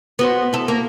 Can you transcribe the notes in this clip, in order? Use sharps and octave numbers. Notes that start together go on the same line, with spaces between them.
B3 F#4 C5
E4 A4
A#3